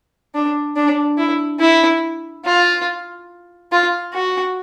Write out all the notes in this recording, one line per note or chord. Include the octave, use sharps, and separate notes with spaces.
D4
D4
E4
E4
F4
F4
F#4